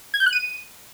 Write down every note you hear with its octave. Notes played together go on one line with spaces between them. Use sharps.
G#6
G6
F#6
D#7